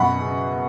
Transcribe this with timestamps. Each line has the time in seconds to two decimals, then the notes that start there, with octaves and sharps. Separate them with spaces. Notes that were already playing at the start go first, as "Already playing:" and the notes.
Already playing: F#2 B2 F#5 B5
0.21 C#3